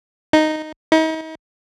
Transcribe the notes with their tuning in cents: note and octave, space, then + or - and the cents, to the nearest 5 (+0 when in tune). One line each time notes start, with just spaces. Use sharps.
D#4 -5
D#4 +40